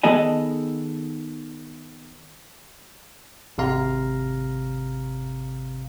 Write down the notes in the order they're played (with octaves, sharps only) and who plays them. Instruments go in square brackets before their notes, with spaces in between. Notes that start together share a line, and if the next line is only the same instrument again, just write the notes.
[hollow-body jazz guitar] D#3 B3 G#4 A4 D#5 G#5
[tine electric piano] G#1 C3 F5 A#5